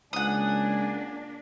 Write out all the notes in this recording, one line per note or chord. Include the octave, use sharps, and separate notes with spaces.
C#2 A#3 D4 F#5 G#5 D#6